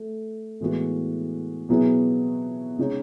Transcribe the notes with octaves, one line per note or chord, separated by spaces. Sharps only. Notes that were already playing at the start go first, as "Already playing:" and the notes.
Already playing: A3
A2 E3 G#3 B3 F#4
B2 F#3 B3 E4 G#4
C#3 G#3 D#4 G#4 C#5